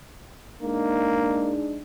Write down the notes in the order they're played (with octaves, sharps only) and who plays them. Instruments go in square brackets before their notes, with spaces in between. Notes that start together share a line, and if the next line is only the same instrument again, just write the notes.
[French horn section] G#3 D4 D#4 [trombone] A#3